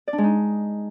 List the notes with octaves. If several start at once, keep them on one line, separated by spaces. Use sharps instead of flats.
D5
D4
G#3
D#4